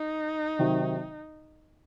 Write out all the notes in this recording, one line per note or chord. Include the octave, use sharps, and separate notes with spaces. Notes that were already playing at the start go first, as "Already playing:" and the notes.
Already playing: D#4
C3 D#3 F#3